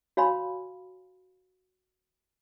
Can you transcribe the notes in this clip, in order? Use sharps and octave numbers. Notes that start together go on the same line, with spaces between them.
F#4 C#5 F5 G#5 B5 C6